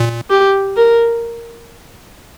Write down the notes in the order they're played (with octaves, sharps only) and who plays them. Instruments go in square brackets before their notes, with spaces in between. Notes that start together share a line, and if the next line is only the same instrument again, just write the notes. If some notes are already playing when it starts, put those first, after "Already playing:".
Already playing: [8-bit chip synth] A#2
[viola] G4
A#4